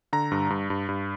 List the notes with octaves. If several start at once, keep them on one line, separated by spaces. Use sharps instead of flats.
D3 A#5
G2
G2
G2
G2